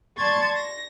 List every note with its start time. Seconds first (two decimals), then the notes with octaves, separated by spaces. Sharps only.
0.16 D5 A5 C6 C#6 G#6 A6
0.55 A#6